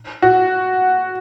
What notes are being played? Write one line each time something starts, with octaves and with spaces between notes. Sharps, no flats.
F#4